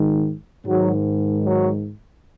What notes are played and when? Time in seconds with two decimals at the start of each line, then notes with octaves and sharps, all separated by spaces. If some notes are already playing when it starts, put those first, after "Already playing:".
Already playing: G#2 D#3
0.65 G#2 D#3 F#3
1.45 F#3